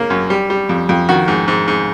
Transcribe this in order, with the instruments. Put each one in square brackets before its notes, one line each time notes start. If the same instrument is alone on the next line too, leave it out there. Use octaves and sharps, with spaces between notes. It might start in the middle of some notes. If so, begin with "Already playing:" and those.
Already playing: [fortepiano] C#3 A#3
F#2
G3
G3
F2
F2
D#3 F#4
G#2
G#2
G#2